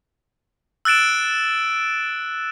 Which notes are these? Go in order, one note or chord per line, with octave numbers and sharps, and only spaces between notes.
E6 F#6 A6 D7 E7